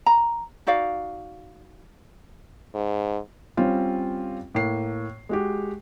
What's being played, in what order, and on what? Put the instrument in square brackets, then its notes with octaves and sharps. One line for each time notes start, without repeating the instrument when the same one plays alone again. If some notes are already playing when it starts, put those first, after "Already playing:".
[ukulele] A#5
D#4 F#4 D5 F5
[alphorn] G#2
[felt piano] G3 C4 C#4 F4
A2 A#3 C7
G#3 F#4 G4